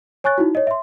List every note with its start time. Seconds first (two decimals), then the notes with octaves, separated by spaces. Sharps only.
0.24 C#5 G#5 C#6 F#6 A6
0.38 D#4 E4 F#4
0.55 C#5 D#5
0.67 E5 C6